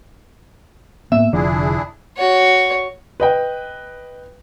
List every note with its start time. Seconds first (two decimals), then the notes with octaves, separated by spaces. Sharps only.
1.12 A2 A#3 B3 E5
1.33 F1 D3 F3 D4 E4 G#4
2.17 F#4 C#5
3.20 B4 D#5 G5